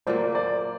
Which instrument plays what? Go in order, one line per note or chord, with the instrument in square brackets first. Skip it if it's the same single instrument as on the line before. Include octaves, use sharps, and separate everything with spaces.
[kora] A#2 F#3 A#3 [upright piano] C5 D5
[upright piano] C5 D5